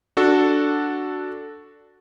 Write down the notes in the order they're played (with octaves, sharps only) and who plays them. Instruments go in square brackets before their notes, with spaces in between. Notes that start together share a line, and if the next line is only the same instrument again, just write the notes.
[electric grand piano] D4 F#4 A4